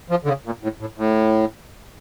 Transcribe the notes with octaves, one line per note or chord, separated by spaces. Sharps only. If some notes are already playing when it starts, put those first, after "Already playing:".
F3
D3
C#3
A#2
A2
A2
A2